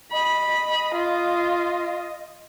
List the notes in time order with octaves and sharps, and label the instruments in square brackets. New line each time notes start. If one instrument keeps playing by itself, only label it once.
[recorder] D#5 [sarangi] B5
[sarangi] F4